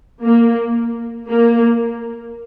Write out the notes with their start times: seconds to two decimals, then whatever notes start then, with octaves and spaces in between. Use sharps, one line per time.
0.22 A#3
1.29 A#3